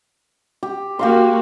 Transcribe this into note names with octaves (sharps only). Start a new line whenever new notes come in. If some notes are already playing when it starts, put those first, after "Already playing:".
G4
A#3 F#4 G4 F5 C6